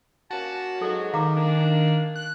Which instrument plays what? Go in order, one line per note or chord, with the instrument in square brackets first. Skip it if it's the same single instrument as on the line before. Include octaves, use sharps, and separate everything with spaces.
[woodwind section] A#3 C#4 A5 [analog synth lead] F#4
[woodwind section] G#2 F#3 [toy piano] A4
[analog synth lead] D#3 [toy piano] F5 A#5 D6
[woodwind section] A#3 D4
[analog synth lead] F#6